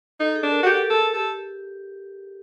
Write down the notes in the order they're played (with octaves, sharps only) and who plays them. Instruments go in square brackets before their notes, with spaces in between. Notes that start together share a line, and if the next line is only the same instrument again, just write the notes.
[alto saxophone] D#4 [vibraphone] A4
[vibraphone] G#4
[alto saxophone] D4
[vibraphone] A#4
[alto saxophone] F#4
[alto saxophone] G4 [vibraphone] A4
[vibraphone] G#4 [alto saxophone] A4
[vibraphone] G4 [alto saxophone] A4